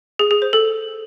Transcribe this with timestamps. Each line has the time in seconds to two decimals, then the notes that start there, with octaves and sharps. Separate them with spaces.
0.19 G#4
0.31 G#4
0.42 C5
0.53 A4